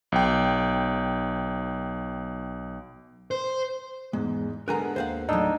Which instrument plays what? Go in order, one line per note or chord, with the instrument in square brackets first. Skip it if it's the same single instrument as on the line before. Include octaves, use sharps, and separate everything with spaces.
[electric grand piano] B1 G5
[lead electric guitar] C5
[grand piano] E2 G#2 [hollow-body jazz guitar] G#3
[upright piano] D3 G#3 B3 [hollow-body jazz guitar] A#4 G#5 A#5 [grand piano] F#6
[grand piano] D#2 [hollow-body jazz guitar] C5 F5 F#5
[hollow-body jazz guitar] A2 F#3 [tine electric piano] D4 D#4 [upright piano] E6